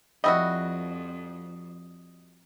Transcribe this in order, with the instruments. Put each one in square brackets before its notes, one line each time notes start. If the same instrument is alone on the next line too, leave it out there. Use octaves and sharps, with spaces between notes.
[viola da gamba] F2 F3 [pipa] G3 E4 F#4 [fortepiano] D#5